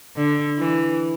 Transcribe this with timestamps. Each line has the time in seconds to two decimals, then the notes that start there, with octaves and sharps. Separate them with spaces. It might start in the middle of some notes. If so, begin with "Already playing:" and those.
0.16 D3
0.58 E3